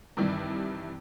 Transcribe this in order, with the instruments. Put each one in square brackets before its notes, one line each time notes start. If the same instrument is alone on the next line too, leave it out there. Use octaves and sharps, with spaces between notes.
[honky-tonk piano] G2 C3 D#3 E3 G3